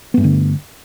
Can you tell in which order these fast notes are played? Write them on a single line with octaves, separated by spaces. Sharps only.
B3 G2 A3 D3